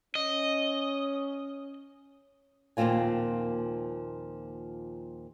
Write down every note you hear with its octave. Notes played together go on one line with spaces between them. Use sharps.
C#4 D#5
D#2 A#2 F3 C4 F4 G#5